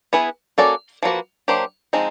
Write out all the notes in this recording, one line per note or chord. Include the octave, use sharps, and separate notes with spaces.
B3 E4 G#4 B4
A#3 C#4 F#4 A4 D5
F3 A#3 C#4 F#4 B4
F#3 A#3 D4 G4 C5
F3 G#3 C4 D#4